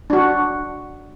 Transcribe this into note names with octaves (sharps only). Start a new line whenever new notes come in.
D4 F#4